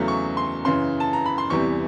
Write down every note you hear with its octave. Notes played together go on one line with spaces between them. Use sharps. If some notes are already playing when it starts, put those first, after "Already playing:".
Already playing: E2 C#3 F#3 A3
C#6
C6
F#2 C#3 E3 C6
A5
A#5
B5
C6
E2 C3 E3 G3 C#6